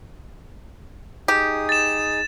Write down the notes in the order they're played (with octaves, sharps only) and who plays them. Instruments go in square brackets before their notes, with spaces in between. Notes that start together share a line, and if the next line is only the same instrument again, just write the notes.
[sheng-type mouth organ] D#4 G#4 D#6 [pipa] G4
[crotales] A6 E7